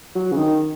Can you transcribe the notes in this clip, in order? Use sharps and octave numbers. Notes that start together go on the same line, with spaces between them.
F#3
C#3
D#3